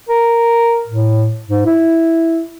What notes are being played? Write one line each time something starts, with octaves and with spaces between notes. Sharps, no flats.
A#4
A2
G#2
E4